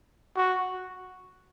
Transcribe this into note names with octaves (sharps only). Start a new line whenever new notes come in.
F#4